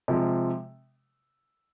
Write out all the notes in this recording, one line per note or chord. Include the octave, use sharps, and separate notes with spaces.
C3 F3 G#3